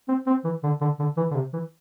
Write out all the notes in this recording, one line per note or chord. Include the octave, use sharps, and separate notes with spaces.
C4
C4
E3
D3
D3
D3
E3
D3
C3
E3